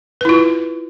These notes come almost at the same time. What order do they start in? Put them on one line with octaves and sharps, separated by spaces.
B4 E4 F4